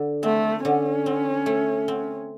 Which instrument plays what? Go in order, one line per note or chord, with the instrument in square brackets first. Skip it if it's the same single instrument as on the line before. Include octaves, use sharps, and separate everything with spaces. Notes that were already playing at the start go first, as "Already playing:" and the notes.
Already playing: [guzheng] D3
[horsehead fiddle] A3 [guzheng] C4
[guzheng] D3 [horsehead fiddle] C#4
[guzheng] C4
A3
C4